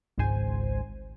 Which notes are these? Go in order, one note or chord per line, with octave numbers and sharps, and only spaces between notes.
G#1 C#2 G#2 C5 G#5